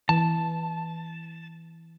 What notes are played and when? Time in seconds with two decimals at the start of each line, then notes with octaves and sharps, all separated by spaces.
0.09 E3 A5